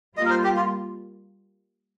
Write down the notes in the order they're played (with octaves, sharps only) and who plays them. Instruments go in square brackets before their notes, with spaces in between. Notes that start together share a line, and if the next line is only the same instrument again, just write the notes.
[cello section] G3 A#3 F4 [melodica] D#5
[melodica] A#4
C5
G4
F4